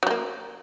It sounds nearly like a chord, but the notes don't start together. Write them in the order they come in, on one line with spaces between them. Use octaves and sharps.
F#3 G3 A#3